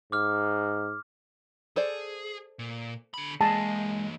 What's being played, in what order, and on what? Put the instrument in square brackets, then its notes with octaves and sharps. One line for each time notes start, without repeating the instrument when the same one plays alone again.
[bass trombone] G#2 [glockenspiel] D6 F6
[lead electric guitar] G#4 [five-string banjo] A4 C5 D5
[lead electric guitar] A#2
D3 B5
[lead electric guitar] E3 A#3 [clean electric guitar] G#3 G#4 [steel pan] A5